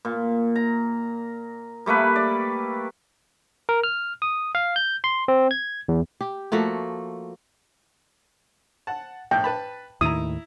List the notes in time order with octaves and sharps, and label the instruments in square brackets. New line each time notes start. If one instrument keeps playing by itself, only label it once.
[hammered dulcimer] A#2
A#5
G3 A3 A#3 B4
D5
[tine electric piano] A#4
F6
D#6
F5
G6
C6
C4
G#6
E2
[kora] G4
F3 A3 A#3 F#4
[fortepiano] F#5 A5
[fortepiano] A#1 A2 [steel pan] G5
[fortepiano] B4 A5 B5
[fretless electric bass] D#2 A2 D#3 [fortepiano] E4 A#5 [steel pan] D#6